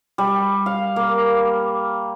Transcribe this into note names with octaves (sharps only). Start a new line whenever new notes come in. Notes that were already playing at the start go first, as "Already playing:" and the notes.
G3
F5
A#3